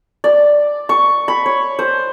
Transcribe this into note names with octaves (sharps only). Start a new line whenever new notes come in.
D5
C#6
B5
C#5
C5